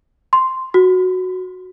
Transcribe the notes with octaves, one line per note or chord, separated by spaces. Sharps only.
C6
F#4